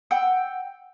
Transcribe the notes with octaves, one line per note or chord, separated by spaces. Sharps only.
F#5 G5 E6